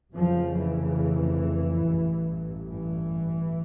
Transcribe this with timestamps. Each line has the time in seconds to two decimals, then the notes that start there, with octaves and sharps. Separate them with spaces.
0.15 F1 F2 C#3 F3
0.56 E3
1.84 A1 G2
2.68 E3